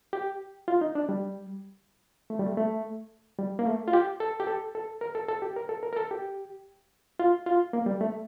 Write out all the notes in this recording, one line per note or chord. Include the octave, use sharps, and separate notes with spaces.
G4
F4
D#4
D4
G3
A3
G3
A3
A3
G3
A#3
A3
F4
G4
A4
G4
A4
A4
A#4
A4
A4
G4
A#4
A4
A#4
A#4
A4
G4
F4
F4
A#3
G3
A3